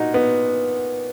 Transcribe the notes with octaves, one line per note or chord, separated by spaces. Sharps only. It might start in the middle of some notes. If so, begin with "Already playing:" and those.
Already playing: A#2 D#4 F#4
B3